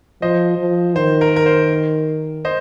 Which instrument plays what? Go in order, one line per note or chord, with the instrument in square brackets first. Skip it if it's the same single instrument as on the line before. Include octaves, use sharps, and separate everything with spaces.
[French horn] F3 [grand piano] C5 D#5
[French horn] F3
[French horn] D#3 [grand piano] C5
[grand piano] A#4
A#4
C5
C5 D#5